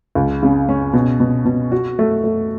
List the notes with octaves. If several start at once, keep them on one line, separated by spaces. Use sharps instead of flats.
C#2
C#3
C#4
B2
B2
B2
F#4
A3
A3